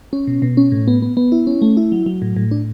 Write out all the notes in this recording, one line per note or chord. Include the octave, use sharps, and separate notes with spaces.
C#4
B2
B2
C#4
A2
B3
B3
B3
E4
C#4
A3
E4
F#3
F#3
A2
A2
D4